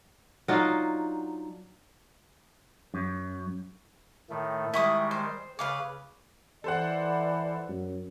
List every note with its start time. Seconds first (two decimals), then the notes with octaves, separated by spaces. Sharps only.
0.48 F#3 D4 D#4 F4
2.94 F#2
4.30 A2 D#3 A3
4.74 D#3 G3 G#3 E4 C#6 D#6
5.11 C5
5.59 C#3 B4 F5 D6
6.64 E3 A4 C5 D5 F#5
7.69 F#2